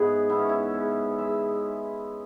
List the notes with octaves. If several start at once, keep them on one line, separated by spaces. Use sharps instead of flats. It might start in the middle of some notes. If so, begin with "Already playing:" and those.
Already playing: G#2 E3 B3 G#4 B4 C#5
B3 E4
C#4
E4
C#3
G#3 E5